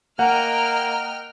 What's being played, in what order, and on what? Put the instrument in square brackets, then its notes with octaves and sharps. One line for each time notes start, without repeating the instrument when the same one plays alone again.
[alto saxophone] A#3 [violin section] D#5 G5 F6 [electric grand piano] F#5 [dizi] A#5